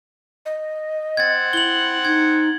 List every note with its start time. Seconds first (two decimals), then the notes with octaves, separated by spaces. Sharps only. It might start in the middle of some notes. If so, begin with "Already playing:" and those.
0.46 D#5
1.17 C4 F#5 G#6 A6
1.53 E4 F#7 G7
2.05 D#4 G#6